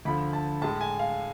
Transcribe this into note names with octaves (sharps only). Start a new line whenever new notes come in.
D2 D3 F3 A3 B5
A5
A2 G#3 A5
G#5
F5